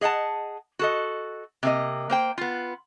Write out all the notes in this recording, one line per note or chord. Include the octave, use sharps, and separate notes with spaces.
G#4 D#5 F#5 G#5 A5
F#4 A4 D#5
C3 A#3 D#5
A#3 C5 G5
B3 F4